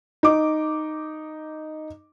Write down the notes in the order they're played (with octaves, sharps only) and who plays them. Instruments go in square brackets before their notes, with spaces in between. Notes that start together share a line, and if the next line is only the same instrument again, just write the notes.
[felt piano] D#4 D6